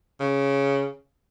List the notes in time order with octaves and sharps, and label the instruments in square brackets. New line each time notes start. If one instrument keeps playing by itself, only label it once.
[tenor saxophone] C#3